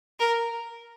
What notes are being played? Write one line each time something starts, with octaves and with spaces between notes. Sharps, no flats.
A#4